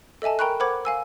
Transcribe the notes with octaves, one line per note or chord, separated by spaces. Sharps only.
A4 D#5 E5 G#5 A5
A#4 G5 A#5 B5 C#6 F#6
A#4 C5 F#5 B5 D6 G#6
F5 G#5 E6